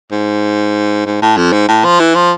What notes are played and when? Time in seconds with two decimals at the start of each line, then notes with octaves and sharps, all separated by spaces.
0.12 G#2
1.06 G#2
1.22 A2
1.37 F2
1.53 G#2
1.68 A2
1.84 F3
2.00 E3
2.15 F3